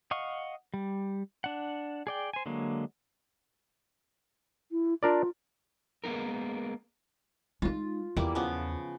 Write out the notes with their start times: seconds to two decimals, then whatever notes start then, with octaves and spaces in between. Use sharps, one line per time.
0.11 D#5 F5 F#5 C#6
0.74 G3
1.44 D4 F#5
2.07 G#4 D5 G5
2.33 C5 G#5
2.46 D3 F#3 G#3 A#3
4.71 E4
5.03 D4 F4 A#4 D5
6.04 G#3 A#3 B3 D#4 A#4
7.62 G#3 D#4 F4
8.17 E2 G3 A#3 E4
8.35 C#3 F3 B3